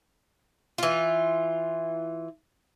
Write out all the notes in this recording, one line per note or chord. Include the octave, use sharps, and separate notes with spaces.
E3 F4